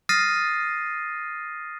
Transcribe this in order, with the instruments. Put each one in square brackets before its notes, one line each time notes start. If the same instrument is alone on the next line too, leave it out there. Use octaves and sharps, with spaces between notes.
[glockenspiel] D#6 F6 A6 A#6 C7 D#7